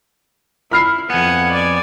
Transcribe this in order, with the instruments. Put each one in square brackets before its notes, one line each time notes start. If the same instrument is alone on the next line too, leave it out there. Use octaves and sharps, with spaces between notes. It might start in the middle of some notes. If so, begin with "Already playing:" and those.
[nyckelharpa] E4 [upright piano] B5 F6 C7
[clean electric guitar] F2 B3 [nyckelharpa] F#5 G#5
[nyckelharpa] D5 G#5